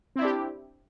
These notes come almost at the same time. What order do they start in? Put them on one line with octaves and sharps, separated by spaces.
C4 E4 D4 G4